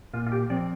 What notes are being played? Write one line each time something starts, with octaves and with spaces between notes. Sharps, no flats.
A#2 F4
F4
G4
F3 C4 D5